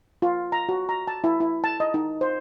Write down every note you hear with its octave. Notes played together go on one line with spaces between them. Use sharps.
F4
A#5
F#4
A#5
A5
E4
E4
A5
D#5
D#4
C5